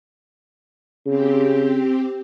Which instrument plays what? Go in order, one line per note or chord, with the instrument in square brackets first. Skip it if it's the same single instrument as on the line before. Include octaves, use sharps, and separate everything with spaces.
[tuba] C#3 [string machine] C4 G4